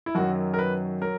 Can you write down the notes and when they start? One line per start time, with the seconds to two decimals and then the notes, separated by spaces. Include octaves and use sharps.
0.06 E4
0.15 F#2 D#3 F#3 F#4
0.54 A#4
0.59 B4
1.02 F#3 A#4